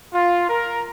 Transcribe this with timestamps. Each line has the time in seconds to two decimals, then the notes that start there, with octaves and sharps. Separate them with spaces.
0.13 F4
0.49 A#4